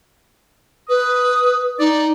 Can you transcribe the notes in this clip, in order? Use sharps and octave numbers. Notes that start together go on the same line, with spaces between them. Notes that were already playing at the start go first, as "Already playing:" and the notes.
B4 D#6
D#4 D5